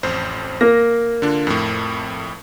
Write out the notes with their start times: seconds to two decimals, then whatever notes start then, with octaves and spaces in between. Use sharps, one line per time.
0.03 A1 F2 C5
0.61 A#3 A#6
1.22 D3 D4 F4
1.47 F2 A2